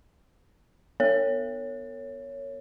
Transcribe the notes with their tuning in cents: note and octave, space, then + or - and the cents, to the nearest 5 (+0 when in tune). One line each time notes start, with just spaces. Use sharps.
B3 +0 A#4 -40 C#5 +0